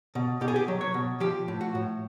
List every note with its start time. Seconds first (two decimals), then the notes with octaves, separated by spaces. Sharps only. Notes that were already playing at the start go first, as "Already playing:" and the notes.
0.15 B2
0.41 B2 G4
0.48 G#4
0.56 G4
0.68 F#3
0.81 C#5
0.94 B2
1.20 F3 G4
1.48 A2
1.61 F#4
1.75 A2